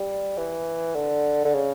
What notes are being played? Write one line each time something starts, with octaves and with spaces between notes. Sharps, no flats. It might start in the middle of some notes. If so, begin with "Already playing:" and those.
Already playing: G3
E3
D3
D3
C#3